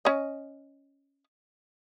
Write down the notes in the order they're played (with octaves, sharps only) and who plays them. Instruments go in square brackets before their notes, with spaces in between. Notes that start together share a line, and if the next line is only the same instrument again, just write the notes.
[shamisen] C#4 D#5